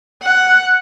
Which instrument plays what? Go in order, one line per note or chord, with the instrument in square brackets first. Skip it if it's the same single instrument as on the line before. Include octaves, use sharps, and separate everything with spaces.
[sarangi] F#5